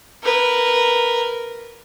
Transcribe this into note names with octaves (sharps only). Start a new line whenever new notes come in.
A#4 B4